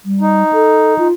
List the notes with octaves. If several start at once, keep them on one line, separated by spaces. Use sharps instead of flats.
G3
D#4
A4
F4